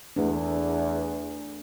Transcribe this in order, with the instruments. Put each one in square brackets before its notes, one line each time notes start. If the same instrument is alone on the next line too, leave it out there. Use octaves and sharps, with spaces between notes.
[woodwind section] E2 [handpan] A3 D4